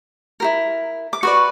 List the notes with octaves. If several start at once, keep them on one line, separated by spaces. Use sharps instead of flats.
E4 G4 A#4
D6
F#4 B4 D5 C#6